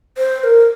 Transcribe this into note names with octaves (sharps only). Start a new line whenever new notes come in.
C5
C5
A#4